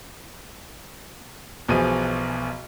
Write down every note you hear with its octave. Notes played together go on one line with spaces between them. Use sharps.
B1 B2 E3 F3 G#4 D#7